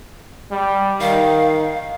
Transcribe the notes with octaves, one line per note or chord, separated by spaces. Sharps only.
G3
D#3 F5